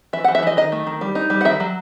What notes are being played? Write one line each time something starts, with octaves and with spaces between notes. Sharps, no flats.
E3 E5
E3 F#5
E5
E3 D#5
D#3 D#5
A3
D#3
G3
D#4
G3
F#5
D#3 E5
F#3